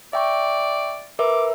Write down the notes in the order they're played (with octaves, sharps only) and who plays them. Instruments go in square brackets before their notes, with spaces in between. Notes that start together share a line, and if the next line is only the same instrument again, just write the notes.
[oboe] D5 [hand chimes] E5 G5 C#6
[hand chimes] A#4 B4 E5 [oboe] D6